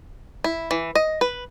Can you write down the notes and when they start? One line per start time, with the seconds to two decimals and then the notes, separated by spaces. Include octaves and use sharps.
0.44 E4
0.71 E3
0.95 D#5
1.21 B4